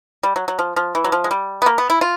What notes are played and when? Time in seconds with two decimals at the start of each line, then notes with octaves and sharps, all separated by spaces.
0.23 G3
0.36 F#3
0.48 F#3
0.59 F3
0.76 F3
0.95 E3
1.04 F#3
1.12 F3
1.24 G#3
1.31 G3
1.62 B3
1.66 A#3
1.78 B3
1.90 E4
2.01 F4